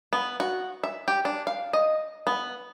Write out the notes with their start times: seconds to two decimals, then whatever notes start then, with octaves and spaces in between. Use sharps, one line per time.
0.13 B3
0.40 F#4
0.84 E5
1.08 G4
1.25 D4
1.47 F5
1.73 D#5
2.27 B3